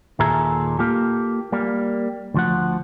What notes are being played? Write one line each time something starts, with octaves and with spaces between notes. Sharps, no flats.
D#2 A#2 G#4 A4 E5 A#5
A#3 F4 G4 A4
G3 A#3
D2 F3 F#5